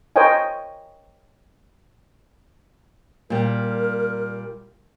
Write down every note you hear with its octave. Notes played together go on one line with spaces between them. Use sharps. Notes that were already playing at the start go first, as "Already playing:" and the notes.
A#4 C5 C#5 D#5 G5 G#5
A#2 G3 A#4